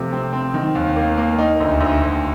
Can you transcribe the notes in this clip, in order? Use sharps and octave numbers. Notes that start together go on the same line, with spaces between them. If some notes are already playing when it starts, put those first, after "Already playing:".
Already playing: C3 F3 A3
C4
C4
D#3
D#2
A#3
A#3
D#4
D2
D2
D2